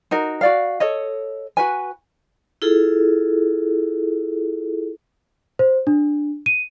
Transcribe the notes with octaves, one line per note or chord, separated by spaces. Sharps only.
D#4 F#4 A#4
F#4 D5 F5
A4 C#5 D#5
F#4 B4 G#5
E4 F4 G#4 A4
C5
D4
D#7